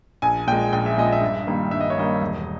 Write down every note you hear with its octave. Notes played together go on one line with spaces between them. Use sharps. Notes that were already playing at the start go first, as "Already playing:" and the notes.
A#1 G#5
A#2 G#3 G5
A#1 G5
E5
A#2 G#3 D#5
E5
G2
D#3 G3 A#3
G2 E5
D#5
C#5
D#3 G3 A#3 D#5
E1